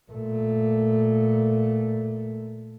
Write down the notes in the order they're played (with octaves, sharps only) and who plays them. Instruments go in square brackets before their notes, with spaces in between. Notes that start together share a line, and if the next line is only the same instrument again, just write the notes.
[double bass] A#2 A3